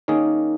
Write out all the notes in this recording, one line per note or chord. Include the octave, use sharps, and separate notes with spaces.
D#3 A#3 C#4 D#4 G#4